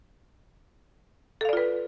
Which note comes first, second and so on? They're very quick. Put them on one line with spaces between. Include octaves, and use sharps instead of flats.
A4 F5 D5 F4 B4